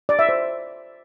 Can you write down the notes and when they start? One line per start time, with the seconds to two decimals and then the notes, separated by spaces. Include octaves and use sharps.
0.09 D5
0.19 E5
0.29 C5